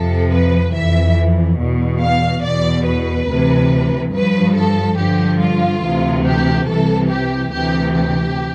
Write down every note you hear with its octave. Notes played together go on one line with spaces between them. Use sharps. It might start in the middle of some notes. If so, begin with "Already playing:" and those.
Already playing: F2 C3 F3 A4
B4
F2 E3 E5
E2 B2
F5
E2 B2 D5
B4
D2 C3 E3
G2 F3 B4
A4
G2 D3 F3 G4
F4
D2 C3 E3
G4
C2 C3 E3 A4
G4
D2 C3 E3 G4
G4